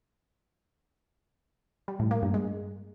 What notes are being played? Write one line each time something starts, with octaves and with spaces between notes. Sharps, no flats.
G3
A2
A#3
G2
G#3